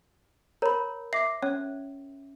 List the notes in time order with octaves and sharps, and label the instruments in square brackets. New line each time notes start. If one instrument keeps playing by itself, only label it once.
[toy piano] A#4 C#5 [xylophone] A#5 B5
[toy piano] E5 [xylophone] D6 C7
[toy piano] C#4 [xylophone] C#5